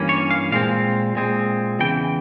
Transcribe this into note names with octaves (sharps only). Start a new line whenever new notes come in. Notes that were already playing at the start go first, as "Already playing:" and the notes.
Already playing: G2 E3 A#3 C#4
C#5
F5
A#2 G#3 C4 F5
A#2 G#3 C4
E2 C#3 E3 G5